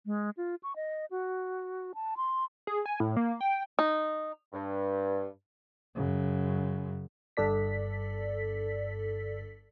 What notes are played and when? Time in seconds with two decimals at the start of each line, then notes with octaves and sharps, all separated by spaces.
0.06 G#3
0.37 F4
0.63 C#6
0.76 D#5
1.11 F#4
1.95 A5
2.17 C6
2.67 G#4
2.86 G#5
3.00 A2
3.16 A#3
3.41 G5
3.79 D#4
4.53 G2
5.95 F#2 C#3
7.37 G1 G2 A4 D5 B6